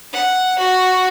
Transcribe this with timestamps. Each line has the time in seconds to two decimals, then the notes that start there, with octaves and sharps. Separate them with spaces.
0.13 F#5
0.58 F#4